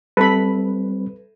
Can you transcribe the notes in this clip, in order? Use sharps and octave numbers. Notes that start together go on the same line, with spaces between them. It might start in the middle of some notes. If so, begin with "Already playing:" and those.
G3 C4 A4 B4 B5